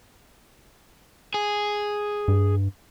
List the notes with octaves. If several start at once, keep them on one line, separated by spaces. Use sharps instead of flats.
G#4
G2